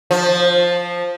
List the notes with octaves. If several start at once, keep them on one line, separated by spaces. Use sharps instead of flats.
F3